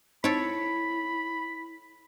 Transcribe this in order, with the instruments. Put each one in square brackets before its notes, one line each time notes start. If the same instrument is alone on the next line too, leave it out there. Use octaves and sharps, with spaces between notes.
[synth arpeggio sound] C4 D#4 D7 [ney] E4 [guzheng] A4 C#5 [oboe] B5